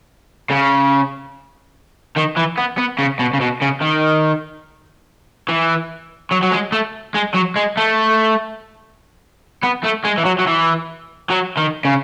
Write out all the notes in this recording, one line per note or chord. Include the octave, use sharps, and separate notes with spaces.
C#3
D#3
E3
B3
B3
C#3
B2
C#3
B2
C#3
D#3
E3
F#3
F#3
G#3
A3
G#3
F#3
G#3
A3
B3
A3
G#3
E3
F#3
F#3
E3
F#3
D#3
C#3